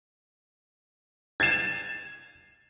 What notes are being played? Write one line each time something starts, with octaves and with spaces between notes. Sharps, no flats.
G#6 A6 C7 E7